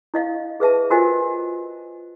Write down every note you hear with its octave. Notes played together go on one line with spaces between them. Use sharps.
E4 D#5 F5
G#4 B4 E5 A5
F4 F#4 A#4 C5 D#5 G#5